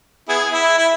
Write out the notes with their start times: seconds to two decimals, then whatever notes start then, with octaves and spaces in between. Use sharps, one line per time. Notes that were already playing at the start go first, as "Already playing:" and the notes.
0.29 B3 E4 G#4
0.53 E4
0.79 E4